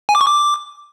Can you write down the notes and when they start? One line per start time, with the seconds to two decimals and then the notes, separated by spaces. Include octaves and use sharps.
0.09 G#5
0.15 D6
0.21 C#6
0.27 D6